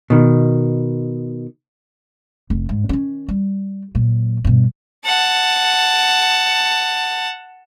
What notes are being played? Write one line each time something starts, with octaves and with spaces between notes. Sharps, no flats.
B2 D#3
F1
G#2
D#3 C#4
G3
A#2 F#3
G2 B2
F#5 A5